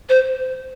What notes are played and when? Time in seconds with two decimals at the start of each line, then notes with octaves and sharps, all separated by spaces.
0.09 C5